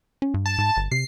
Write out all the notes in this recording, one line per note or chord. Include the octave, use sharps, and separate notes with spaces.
C#4
G2
A5
G#2
G1
C3 C7